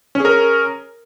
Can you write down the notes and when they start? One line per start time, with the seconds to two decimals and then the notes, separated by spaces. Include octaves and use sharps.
0.15 C#4
0.20 G#4
0.25 A#4